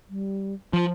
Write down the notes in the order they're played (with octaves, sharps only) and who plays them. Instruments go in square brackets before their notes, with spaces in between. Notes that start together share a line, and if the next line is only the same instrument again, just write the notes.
[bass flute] G3
[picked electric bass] F3